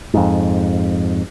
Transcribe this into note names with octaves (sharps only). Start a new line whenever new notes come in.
F2 G#2